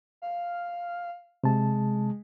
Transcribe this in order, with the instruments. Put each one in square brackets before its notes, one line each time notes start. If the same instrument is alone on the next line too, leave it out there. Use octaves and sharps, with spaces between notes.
[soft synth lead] F5
[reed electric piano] C3 A5 [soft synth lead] G#3